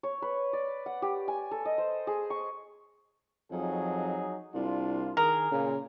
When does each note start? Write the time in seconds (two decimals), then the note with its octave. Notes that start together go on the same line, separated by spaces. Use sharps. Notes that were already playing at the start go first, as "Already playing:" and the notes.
0.03 C#5
0.22 B4
0.53 D5
0.86 F#5
1.02 G4
1.28 G#5
1.51 A4
1.65 D#5
1.78 C5
2.07 G#4
2.30 C#6
3.51 F2 F#3 D#4 G#4
4.54 C2 D4 F4
5.17 D#3 G#4 A#4
5.52 A#2 C#3